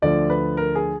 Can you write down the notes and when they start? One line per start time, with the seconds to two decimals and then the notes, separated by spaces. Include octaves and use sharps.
0.02 D2 D3 F3 D5
0.30 B4
0.57 A#4
0.75 G#4